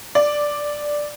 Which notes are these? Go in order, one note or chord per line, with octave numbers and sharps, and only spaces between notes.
D5